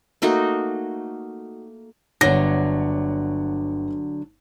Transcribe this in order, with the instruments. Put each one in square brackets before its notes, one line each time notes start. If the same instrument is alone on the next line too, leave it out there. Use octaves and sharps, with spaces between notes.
[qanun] A3 A#3 D#4 F#4
[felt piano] G1 C#5 A#6 [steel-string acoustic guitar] D3 F#3